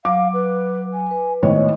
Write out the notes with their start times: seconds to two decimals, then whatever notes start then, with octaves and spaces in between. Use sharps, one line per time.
0.05 F#3 F5 D6
0.34 B4
0.93 G#5
1.11 B4
1.43 G#1 A2 B3 C#5 D#5